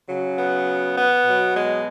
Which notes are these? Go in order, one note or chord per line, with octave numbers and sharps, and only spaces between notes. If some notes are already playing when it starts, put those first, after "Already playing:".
C#3 F#3
B3
B3
B2 F#3
G#3